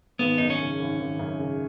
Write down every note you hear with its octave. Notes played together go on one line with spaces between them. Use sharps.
G#1 B3
F#2 D#4
C#4
C#3
G#1
G#1
F#2
C#3